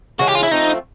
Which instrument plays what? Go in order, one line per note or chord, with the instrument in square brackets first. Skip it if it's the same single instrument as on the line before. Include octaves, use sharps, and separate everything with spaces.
[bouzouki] C#3 E3 G#3 C#4 [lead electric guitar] F#4
[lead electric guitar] G4
F4
E4
[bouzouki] F3 A3 C4 F4 [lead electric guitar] D#4